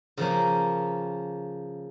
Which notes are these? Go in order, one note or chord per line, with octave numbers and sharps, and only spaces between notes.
C#3 F3 A#3 C#4